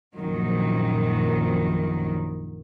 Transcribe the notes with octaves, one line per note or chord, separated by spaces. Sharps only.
A#1 F#2 D#3 F#3